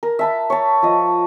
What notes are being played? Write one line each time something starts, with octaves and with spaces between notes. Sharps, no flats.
A#4
E5 A5 B5
C#5 A5
F3 D#5